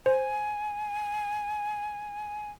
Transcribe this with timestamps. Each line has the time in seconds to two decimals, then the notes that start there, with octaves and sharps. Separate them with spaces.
0.06 C5 G#5